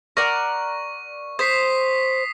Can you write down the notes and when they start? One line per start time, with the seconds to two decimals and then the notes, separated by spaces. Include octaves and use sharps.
0.17 A#4 D5 F#5 C#6
1.39 C5 D#6 B6 C7